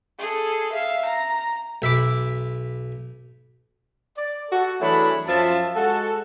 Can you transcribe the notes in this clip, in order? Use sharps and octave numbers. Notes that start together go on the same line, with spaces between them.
G#4 A4
E5 F5
A#5
B1 E5 B5 D6
D5
F#4 A4
E3 F#3 A3 D4 G#4 B5
F#2 F3 F4 E5 A5
G#3 F#4 A4